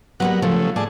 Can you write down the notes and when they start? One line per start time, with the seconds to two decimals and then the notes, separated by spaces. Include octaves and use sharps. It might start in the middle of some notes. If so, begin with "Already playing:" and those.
0.20 F#3 G3 A#3 B3 F#5
0.42 C#3 F3 A3
0.76 A2 G#4 D5 A5